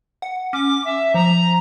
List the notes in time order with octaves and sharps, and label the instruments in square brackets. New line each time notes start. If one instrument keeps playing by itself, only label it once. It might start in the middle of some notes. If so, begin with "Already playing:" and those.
[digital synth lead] F#5
[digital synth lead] C#4 [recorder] D6
[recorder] E5
[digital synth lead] F3 [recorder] A#5